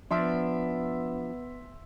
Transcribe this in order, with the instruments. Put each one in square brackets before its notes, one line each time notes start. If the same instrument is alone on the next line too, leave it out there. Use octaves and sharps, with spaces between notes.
[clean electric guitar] F3 D4 [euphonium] B3 [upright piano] E5 C6